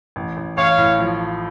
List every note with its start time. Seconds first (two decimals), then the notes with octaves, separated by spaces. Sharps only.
0.16 A1
0.37 A1
0.57 A1 C#5 F5
0.78 A2
0.99 F3